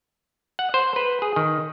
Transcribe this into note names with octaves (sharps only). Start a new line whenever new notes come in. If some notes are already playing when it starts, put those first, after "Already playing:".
F#5
C5
B4
G#4
D#3